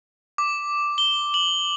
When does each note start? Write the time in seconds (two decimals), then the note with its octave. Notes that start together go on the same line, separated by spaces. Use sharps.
0.38 D6
0.98 G7
1.34 F#7